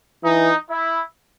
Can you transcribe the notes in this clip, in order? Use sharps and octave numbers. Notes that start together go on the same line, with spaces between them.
E3 D#4
E4